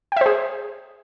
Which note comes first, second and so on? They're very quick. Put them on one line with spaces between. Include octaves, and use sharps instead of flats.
G5 E5 C5 G#4